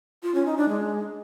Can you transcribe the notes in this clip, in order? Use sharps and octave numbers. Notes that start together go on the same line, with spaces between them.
F4
C#4
D#4
D4
G#3